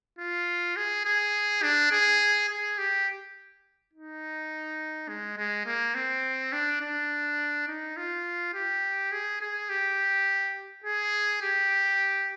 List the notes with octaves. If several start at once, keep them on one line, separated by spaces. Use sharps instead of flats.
F4
G#4
G#4
D4
G#4
G#4
G4
D#4
G#3
G#3
A#3
C4
D4
D4
D#4
F4
G4
G#4
G#4
G4
G#4
G4